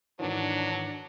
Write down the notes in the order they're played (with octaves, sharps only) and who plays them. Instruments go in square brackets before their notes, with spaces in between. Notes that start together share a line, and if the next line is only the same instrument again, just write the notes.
[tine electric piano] G#2 D#3 E3 [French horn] F#3 [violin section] D4